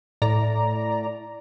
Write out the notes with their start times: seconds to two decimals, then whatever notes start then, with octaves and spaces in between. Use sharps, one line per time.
0.22 A2 D5 A#5